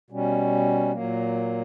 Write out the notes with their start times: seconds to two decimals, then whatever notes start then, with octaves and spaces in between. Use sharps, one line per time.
0.10 B2 G3 C#4
0.92 A#2 F#3 A#3